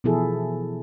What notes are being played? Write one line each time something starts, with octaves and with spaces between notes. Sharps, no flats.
B2 E3 F3 E4 G#4 A4